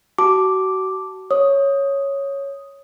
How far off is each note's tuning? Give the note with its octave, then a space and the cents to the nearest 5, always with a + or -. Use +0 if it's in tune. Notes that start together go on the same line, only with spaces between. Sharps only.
F#4 +30 A5 +0 D6 +0
C#5 +0 D#6 +0